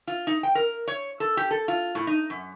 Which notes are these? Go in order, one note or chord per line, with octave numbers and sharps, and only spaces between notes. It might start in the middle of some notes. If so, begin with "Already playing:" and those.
F4
D#4
G5
A#4
C#5
A4
G4
A4
F4
A2
D#4
F#2